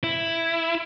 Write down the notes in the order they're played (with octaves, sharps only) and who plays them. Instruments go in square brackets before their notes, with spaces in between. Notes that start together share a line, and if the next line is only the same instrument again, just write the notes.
[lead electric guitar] E4